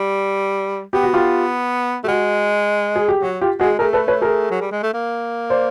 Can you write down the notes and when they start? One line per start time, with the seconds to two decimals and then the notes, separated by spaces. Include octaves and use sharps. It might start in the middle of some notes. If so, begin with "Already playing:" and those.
Already playing: G3
0.93 B3 G4
1.03 F#4
1.13 F4 G4
2.03 A3 G4
2.08 G#3 F#4
2.96 G#4
3.09 G4
3.22 F#3 F#4
3.41 F4 G4
3.60 G#3 F#4 G#4
3.79 A3 G#4 A#4
3.93 A4 B4
4.08 B4 C#5
4.22 G#4 A#4
4.51 F#3
4.61 G3
4.71 G#3
4.83 A3
4.93 A#3
5.50 C5 D5